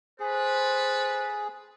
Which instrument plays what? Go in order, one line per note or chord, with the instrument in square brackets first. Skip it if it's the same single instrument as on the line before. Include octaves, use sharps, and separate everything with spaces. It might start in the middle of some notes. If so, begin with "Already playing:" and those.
[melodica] G#4 [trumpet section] A4 B4 [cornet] C5